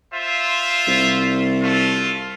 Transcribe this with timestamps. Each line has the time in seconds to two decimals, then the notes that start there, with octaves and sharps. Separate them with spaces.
0.14 F4 C5 E5
0.87 C2
1.62 A3 F4